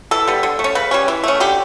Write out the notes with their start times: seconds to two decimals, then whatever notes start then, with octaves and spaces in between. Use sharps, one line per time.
0.11 E3 A4
0.27 G3 B3
0.43 D3
0.59 A3
0.64 C#4
0.75 C#3 B4
0.91 G3 C#4
1.08 E3
1.24 A3 C#4
1.40 D3 G4